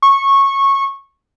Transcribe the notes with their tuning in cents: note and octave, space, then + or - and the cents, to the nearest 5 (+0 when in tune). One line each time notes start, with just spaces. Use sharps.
C#6 -15